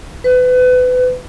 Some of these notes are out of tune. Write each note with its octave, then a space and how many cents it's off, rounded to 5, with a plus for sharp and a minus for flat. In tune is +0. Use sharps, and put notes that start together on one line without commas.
B4 +30